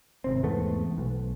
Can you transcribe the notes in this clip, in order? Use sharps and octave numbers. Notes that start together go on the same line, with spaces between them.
G#1 C3 C4
E2 G#2 A3 B3
B1